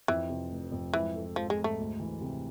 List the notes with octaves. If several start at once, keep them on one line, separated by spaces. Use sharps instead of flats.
F2 E3
C3
F1
F2
G#2 E3
A4
G#2 F3
G#3
G#2
A3
D2
E3
C3